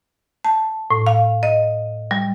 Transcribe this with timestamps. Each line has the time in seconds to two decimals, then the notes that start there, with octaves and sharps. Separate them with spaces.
0.45 A5
0.91 A2
1.07 F5
1.43 D#5
2.11 G3